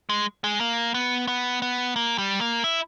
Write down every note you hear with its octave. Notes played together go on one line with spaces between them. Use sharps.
G#3
G#3
A#3
B3
B3
B3
A#3
G3
A#3
E4